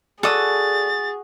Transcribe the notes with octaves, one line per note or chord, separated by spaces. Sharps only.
F#4 G#4 A4 D5 D#6 A6